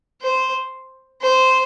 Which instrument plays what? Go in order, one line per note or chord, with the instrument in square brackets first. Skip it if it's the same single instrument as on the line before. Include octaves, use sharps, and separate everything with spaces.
[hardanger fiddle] C5
C5